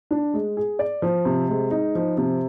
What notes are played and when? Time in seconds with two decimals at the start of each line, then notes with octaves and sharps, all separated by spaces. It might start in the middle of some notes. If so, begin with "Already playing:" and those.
0.11 D4
0.34 G#3
0.57 G#4
0.79 D5
1.02 F3
1.25 C3
1.49 G#3
1.71 D#4
1.95 F3
2.17 C3